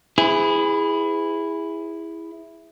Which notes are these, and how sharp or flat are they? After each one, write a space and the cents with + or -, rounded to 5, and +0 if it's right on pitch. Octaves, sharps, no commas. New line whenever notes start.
E4 +0 G#4 -15 B4 +45